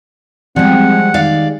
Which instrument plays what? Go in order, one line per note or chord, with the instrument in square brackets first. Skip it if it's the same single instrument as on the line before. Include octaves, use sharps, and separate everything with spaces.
[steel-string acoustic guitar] F3 [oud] G3 G#3 [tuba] C4 [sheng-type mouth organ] F#5
[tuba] D#3 [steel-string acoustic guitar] D5 F5